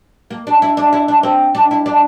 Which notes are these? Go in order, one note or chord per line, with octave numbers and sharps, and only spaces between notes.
A#3
D4
E4
D4
E4
D4
C4
D4
E4
D4